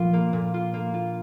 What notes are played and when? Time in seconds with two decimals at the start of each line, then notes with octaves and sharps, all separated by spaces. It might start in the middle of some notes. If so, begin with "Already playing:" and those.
Already playing: A#2 F3 F4
0.13 A#3
0.33 A#2
0.54 F4
0.74 A#3
0.94 F4